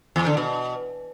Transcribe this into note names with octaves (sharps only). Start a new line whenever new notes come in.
E2
D3
B2